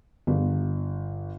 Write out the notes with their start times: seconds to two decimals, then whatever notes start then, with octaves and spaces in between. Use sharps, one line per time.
0.27 G1